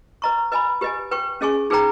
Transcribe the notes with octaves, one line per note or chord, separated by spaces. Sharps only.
B4 D#5 A#5 C#6
B4 D#5 G#5 B5
G4 B4 D#5 G#5
B4 G5 C#6
C#4 G#4 D#5 G#5 C#6
D#4 G#4 B4 G5 A#5